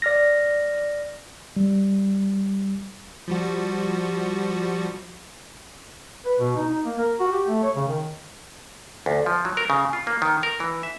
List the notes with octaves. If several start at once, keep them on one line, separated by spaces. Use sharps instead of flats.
D5 F6 A#6
G3
F3 G3 F#4
B4
B2
D#4
D#4
A#3
A#4
F#4
G4
A3
C#5
C#3
D#3
D2
F3
F#3
A#4
C#3
F4
A#3
D#3
A#4
E3
E5